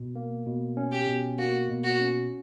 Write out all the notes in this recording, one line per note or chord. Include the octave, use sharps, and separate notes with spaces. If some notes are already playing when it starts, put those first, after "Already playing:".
Already playing: B2
A#3
B2
C#4
G4
B2
A#3 F#4
B2
F#4
C#4